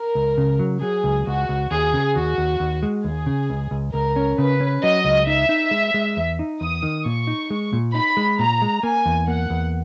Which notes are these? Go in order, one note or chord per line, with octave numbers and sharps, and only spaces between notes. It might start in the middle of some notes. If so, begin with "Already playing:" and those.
Already playing: A#4
C#2
C#3
F#3
F#3 G#4
C#2
C#2 F#4
C#2
D#2 G#4
C#3
D#2 F#4
D#2
D#2
G#3
D#2 G#4
C#3
C#2
C#2
C#2 A#4
C#4
C#3 B4
C#4
F#3 D#5
C#2
D#4 E5
D#4
G#3
G#3
E2
D#4
E2 D#6
D#3
A#2 C#6
D#4
G#3
A#2
D#4 B5
G#3
A#2 A#5
G#3
A#3 G#5
E2
A#3 F#5
E2